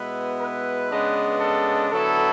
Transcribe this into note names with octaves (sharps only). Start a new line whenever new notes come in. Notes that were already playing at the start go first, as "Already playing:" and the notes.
Already playing: B2 G#3 B3 E4 B4
B4
C#3 G#3 B3 D4
A4
D3 F#3 B3 E4 A4